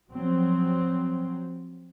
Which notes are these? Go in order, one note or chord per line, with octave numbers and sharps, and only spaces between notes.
F3 F#3 C4